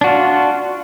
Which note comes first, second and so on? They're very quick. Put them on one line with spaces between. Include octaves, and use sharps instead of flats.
D4 F#4 F4